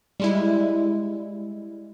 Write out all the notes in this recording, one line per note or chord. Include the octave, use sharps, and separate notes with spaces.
G3 G#3 E4